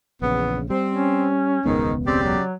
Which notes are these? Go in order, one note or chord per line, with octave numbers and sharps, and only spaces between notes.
A#1 E2 C#3 B3
G3 C4
C#4
E1 C#2 G#2 D#3 B3
C#3 C4 G4 D5
F#3